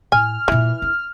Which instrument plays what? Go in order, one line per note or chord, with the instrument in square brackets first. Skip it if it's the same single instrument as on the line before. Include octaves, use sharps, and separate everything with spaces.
[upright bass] A2 [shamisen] G#5 [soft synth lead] F6
[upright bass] A#2 F4 [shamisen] E3
[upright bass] D4